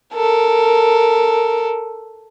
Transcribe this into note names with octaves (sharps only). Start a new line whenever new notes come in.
A4 A#4